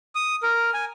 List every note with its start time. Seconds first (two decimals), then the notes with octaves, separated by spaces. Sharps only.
0.15 D#6
0.43 A#4
0.74 G#5